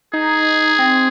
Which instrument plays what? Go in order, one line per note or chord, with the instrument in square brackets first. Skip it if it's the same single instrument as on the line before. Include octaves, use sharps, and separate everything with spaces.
[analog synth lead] D#4 [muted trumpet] G#4
[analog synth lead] C4